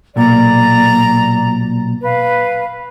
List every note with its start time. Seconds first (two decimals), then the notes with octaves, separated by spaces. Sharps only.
0.16 B1 A#2 D5 A#5
2.02 B4 F5